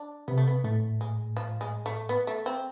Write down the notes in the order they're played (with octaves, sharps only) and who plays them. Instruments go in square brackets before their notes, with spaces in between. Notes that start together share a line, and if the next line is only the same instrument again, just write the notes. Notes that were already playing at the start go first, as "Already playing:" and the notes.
Already playing: [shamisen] D4
[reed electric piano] C3 [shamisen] B3
[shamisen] A3
B3
[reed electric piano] A2 [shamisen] A3
[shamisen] G#3
F3
G#3
A3
B3
A3
C4